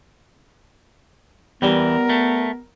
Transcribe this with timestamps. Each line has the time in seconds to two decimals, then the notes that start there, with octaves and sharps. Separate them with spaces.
1.62 E2 E3 G3 B3 A#4
2.09 A3